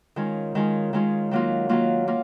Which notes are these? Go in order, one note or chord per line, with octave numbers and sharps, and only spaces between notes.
D#3 G#3 C#4 F4
D#3 G#3 C#4 F4
D#3 G#3 C#4 F4
D#3 F#3 A#3 F4
D#3 F#3 A#3 F4
A#3 F4